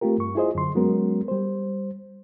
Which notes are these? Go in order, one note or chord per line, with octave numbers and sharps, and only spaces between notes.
A3 C4 F4 G4 A#4
G2 C#6
E4 F4 G#4 C5 D#5
F#2 D3 C6
F#3 G#3 B3 C#4 F#4 A#4
G3 C5